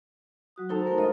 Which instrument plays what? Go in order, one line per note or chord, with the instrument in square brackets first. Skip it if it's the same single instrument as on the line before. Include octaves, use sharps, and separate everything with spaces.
[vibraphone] F#3 F#4 D#6
[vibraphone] D#4 [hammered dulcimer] A4 C5 A#5
[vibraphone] A3 A#4
[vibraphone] G#3 D#5 D#6 [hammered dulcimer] F4